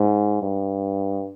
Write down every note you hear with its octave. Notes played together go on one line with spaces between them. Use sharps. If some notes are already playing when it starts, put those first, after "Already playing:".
Already playing: G#2
G2